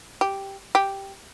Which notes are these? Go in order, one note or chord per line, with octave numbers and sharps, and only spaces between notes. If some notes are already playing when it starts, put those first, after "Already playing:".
G4
G4